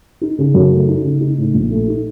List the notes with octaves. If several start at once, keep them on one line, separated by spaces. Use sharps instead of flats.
D#4
C#3
F#2
A3
D#4
C#3
D#4
A2
A#1
A3
D#4